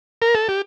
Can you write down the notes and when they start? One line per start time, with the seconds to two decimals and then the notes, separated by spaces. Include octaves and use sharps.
0.22 A#4
0.35 A4
0.48 G4